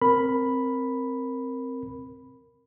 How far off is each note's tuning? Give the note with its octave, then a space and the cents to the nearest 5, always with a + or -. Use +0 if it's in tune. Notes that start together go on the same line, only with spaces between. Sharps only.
C4 +0 A#4 +0 B5 +0